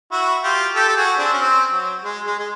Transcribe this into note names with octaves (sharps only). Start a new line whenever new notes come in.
E4 F#4
F4 G4
G4 A4
A4
F#4 G#4
C4 D4
C#4
C4
F#3
G#3
G#3
G#3